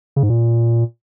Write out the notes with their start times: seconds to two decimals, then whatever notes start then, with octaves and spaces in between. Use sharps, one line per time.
0.16 C#3
0.23 G#2
0.30 A#2